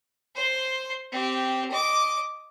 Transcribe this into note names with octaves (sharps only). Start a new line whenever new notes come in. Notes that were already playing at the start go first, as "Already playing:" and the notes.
C5 C6
C4 G4
D#5 D6